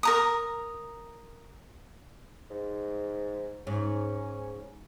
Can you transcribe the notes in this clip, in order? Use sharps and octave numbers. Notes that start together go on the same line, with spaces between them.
A#4 A#5 D#6
G#2
G#2 C#4